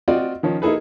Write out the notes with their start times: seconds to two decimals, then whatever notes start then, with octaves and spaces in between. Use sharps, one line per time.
0.08 C4 F4 F#4 D5 D#5
0.43 D#3 F3 C#4
0.62 A#3 D#4 E4 G#4 A4 B4